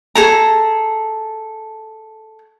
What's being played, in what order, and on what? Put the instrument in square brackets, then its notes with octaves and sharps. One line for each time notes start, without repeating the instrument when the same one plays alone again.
[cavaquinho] G#4 A4 A#5